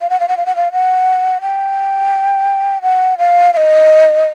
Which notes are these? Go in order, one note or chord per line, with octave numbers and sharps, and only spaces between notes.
F5
F#5
F5
F#5
F5
F#5
F5
F#5
G5
F#5
F5
F5
D#5